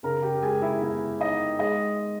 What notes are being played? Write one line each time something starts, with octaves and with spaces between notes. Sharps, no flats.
C#3 A#4 A#5
G4 G5
G#3 G#4 G#5
E4 E5
B3 E4 E5
D#4 D#5
G#3 D#5